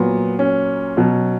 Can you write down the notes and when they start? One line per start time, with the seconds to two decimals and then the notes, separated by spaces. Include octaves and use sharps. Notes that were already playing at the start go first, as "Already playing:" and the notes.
Already playing: A#2 F#3 B3
0.39 C#4
0.97 B2 F#3